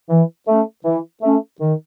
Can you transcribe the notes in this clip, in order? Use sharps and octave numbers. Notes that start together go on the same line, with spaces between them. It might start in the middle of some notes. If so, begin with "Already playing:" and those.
E3
A3 C#4
E3
A3 C#4
D#3